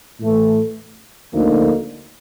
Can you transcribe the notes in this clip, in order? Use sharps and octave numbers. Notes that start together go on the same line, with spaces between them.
A2 E3 A3
D2 D3 F3 A#3 D#4